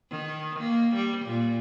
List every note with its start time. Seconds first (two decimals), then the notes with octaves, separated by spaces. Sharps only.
0.10 D#3
0.59 A#3
0.95 G3
1.25 A#2